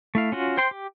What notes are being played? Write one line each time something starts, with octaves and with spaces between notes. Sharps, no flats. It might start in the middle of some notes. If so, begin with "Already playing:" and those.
A3 E4 F5
C#4 F4 F#4
C5 G5 C6
G4